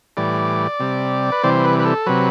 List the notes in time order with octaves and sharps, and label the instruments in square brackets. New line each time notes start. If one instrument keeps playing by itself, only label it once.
[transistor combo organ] A2 E3 G3 D5
C3 G3
B4
C3 E3 G3 C5
B4
B4
A4
C3 F#3 B4